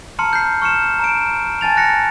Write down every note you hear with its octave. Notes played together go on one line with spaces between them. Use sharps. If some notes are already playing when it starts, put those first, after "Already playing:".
A5 A#5 C6 F6 C#7
G6 C7
C#6 F6 C#7 E7
A#5 D7
G#5 A5 A6 F7
F#6 A#6 C#7